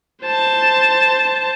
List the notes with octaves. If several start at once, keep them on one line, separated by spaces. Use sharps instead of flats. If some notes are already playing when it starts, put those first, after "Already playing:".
C5 A5